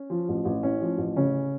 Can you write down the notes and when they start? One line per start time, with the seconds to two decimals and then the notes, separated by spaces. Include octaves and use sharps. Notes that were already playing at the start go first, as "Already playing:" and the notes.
Already playing: C#4
0.10 F3
0.29 A1
0.45 A1
0.63 A2 C#4
0.81 F3
0.98 A1
1.16 C#3 C#4